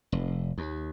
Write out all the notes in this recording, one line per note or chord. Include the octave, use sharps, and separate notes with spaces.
F1
D#2